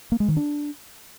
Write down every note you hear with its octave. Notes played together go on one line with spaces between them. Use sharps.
A#3
G#3
D#3
D4